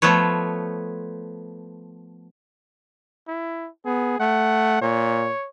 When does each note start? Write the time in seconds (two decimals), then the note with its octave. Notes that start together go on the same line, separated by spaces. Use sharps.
0.02 F3 A3 B3 B4 C#5
3.28 E4
3.85 B3 G#4
4.20 A3 F#5
4.81 A#2 C#5